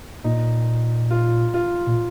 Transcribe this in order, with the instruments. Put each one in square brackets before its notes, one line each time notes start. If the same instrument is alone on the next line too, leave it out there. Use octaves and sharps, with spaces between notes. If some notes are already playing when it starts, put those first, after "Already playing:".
[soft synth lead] A#2 [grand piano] D#4
[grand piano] F4
F4
[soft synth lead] A#2